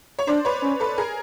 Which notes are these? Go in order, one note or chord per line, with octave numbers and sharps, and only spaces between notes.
C#5
D4 C5 D5
B4 C#5
C#4
A4 B4
G#4 A#4